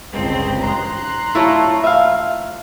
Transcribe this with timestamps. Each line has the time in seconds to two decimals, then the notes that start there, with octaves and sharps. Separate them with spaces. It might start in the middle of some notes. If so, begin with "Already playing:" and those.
0.12 G1 C#2 C4
0.62 A#5 C6 F#6
1.35 A3 E4 F4 C#5
1.84 E5 F5